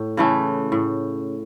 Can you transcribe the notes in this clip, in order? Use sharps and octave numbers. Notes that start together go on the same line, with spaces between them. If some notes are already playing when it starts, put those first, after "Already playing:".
Already playing: A2
C#3 E3 A3
A2